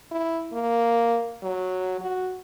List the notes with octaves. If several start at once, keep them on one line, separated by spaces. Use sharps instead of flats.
E4
A#3
F#3
F#4